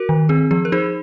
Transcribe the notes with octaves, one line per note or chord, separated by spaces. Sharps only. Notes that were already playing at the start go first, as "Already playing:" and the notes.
Already playing: F#4 A#4
D#3
C4 G#4
F3 G#4
A#4
D#4 G#4 C5